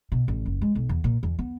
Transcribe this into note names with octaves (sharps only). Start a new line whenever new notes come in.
B2
A1
F#1
G#3
B1
E2
A#2
E2
B3